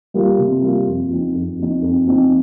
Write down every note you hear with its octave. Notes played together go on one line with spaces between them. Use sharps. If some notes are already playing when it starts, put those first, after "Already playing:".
G3 A#3 F4
C3
G3 A#3 F4
F2
F3 C4 D#4
F2
F3 C4 D#4
F2
F3 C4 D#4